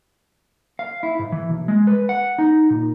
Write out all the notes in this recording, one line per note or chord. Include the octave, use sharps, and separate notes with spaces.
F5
E4
G#2
E3
B1
G#3
B4
F#5
D#4
A#2